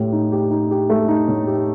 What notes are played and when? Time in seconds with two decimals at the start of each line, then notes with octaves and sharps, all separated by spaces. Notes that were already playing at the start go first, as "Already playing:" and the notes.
Already playing: A2 G4
0.12 D#4
0.32 G4
0.51 D#4
0.71 G4
0.90 A3
1.08 D#4
1.28 A2
1.47 G4